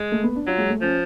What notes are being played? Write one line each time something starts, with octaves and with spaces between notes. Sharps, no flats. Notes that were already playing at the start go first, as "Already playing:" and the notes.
Already playing: G#3
A3
B3
D4
F#3 F4
G#3
A3
F3 C#4